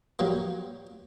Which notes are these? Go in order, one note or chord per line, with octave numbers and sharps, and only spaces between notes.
F#3 G3 A#3